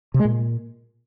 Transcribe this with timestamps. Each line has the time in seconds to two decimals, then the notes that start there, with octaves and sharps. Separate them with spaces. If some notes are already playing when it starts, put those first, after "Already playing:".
0.14 C3
0.20 G#3
0.25 A#2